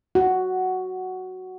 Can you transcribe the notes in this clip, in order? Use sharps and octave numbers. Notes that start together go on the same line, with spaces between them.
F#4